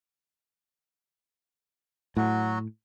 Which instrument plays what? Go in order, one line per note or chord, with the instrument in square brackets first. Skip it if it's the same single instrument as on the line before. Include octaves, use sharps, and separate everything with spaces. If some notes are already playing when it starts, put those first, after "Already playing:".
[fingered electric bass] A2 [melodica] F#3 F#4